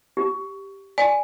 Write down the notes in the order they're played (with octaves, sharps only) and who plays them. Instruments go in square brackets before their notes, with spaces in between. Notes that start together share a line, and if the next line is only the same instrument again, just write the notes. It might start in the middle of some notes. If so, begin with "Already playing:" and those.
[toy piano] G4
[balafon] D5 [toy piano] G#5